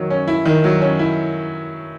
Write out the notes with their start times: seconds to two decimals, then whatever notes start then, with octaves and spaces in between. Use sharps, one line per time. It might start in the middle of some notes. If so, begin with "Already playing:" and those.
Already playing: D#3 F#3
0.10 C#4
0.28 E4
0.45 D#3
0.64 F#3
0.81 C#4
0.99 E4